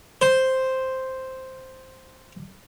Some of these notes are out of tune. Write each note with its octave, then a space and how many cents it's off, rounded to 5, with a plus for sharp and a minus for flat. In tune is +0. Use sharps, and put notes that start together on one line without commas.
C5 +0